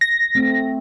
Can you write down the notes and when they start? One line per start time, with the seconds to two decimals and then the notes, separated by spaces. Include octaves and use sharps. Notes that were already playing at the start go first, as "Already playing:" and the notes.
0.01 A#6
0.35 A3 C4